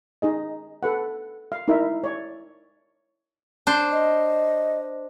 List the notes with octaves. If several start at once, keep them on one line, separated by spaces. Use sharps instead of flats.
D#4 G#4 D#5
A4 B4 F#5
F5
D#4 E4 A#4 E5
C#5 D5
D4 C5
D#5